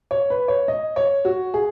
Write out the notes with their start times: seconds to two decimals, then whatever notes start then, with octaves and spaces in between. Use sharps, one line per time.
0.11 C#5
0.30 B4
0.48 C#5
0.68 D#5
0.96 C#5
1.25 F#4
1.54 G#4